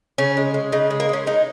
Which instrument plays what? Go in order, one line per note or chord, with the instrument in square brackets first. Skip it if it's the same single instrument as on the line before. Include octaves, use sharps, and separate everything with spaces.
[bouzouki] C#3 C#4
G#3
G#3
C#3 D#4
G#3
A#3
G#3 C#4
G#3 D#4